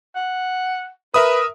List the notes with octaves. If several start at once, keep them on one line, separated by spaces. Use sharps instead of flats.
F#5
A#4 B4 E5 D#6